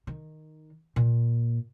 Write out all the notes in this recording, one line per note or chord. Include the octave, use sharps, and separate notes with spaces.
D#3
A#2